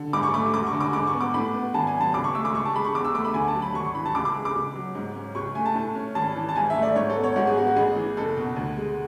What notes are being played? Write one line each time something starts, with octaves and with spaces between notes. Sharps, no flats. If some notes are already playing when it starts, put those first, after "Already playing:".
Already playing: D3
G#2 D6
C#6
A3 D6
E1 D6
C#6
D3
D6
G#2 D6
C#6
B3
D6
A2 B5
B3
G#1 A5
G#5
F#3
A5
C#2 D6
C#6
A3 E6
D6
C#2 C#6
A5
G#3 B5
C#6
E2 D6
E6
A3 D6
B5
D2 G#5
A5
F#3
B5
G#1 C#6
C#6
E3 B5
A5
C#2 D6
D6
G#3
D6
C#2
F#3
G#2
C#4
C#2 C#6
A3 G#5
A5
A2
C#4
G#1 A5
E3
A5
G#2 G#5
E5
A3
D5
G#2 C#5
A4
B3
C#5
G#2 F#4
G#4
B3 F#4
F#4
A1 G#4
E3
F#1 A4
B2
D2
G#3